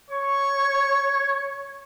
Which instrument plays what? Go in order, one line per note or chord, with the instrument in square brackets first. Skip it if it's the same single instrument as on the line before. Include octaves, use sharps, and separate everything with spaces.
[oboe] C#5 [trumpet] C#6